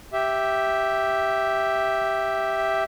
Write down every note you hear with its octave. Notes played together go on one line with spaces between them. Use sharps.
G4 E5